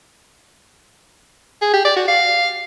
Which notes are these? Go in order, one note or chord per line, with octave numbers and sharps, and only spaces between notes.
G#4
G4
D5
F#4
F5